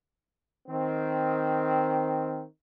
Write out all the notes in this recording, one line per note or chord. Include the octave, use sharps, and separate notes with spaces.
D#3 C4